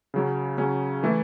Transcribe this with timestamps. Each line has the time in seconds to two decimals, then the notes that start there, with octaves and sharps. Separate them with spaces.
0.14 C#3 F#3 C#4
0.58 C#3 F#3 C#4
1.03 E3 A3 E4 A4